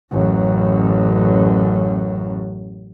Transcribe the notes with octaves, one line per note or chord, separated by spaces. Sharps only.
A1 F#2